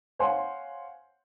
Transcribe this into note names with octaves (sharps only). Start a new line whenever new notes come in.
C5 C#5 F5 F#5 G#5 C6